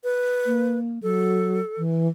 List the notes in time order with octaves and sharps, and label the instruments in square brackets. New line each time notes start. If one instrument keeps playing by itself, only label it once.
[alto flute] B4
[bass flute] A#3
[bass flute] F#3 [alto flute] A4
[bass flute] E3